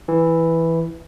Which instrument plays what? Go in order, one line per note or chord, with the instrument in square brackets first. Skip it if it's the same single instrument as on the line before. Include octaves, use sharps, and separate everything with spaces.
[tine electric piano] E3